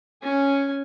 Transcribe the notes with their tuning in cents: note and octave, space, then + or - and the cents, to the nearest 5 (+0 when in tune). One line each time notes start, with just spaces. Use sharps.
C#4 +0 G#5 +0